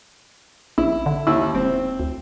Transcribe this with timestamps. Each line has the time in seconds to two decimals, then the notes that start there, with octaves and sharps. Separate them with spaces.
0.78 A#1 E4
1.06 D3
1.27 D#2 E4 E6
1.55 E1 C4
2.00 D2